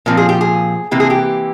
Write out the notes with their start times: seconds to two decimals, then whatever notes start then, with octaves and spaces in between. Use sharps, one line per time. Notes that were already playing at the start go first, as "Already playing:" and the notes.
0.06 A#2 F3 C4 A#4
0.17 G#4
0.29 G4
0.41 G#4
0.91 C3 E3 A#3 G4
1.00 G#4
1.10 G4